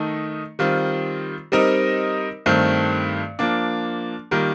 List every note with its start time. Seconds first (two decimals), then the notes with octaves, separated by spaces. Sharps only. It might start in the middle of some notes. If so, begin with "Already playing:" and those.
Already playing: D#3 A3 D#4
0.59 D#3 G3 C4 F4
1.52 G3 C4 D#4 A#4 D#5
2.46 G2 D#3 A3 C4
3.39 F3 A#3 D4
4.31 D#3 G3 A#3 F4 A#4